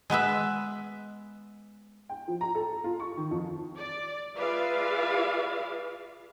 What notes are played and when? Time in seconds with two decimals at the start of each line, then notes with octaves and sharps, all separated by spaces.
0.10 G#3 B3 B4 E5
2.09 G5
2.28 F3
2.41 A#5
2.55 A4
2.84 F4
3.00 C#6
3.17 D#3
3.31 F2
3.77 D5
4.36 F4 G#4 B4 D5 E5 F5